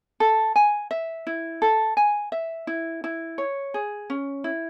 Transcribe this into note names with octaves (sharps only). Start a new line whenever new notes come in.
A4
G#5
E5
E4
A4
G#5
E5
E4
E4
C#5
G#4
C#4
E4